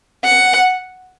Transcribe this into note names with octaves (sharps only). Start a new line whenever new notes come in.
F#5